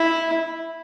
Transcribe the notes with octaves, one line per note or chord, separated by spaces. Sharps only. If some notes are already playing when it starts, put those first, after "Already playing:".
Already playing: E4